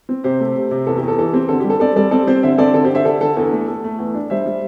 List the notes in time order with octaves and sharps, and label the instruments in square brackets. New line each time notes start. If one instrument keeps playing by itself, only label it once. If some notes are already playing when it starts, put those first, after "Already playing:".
[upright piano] C4
C3 G4 C5
A3
C3
C3
E2 A4
G4
E2
A4
E3 A4
C4 G4
D3 A4
G3 G4
A4
C4 A4 D5
G3 A4 D5
C4 A4 D5
C4 G4 C5
D3 C5 E5
C4 A4 D5
D3 A4
G4 C5
D3
C5 E5
D3 A4 D5
D3 A4
E2 A4
A3
A3 A4
A3
E2
D4
G3 C5 E5
G3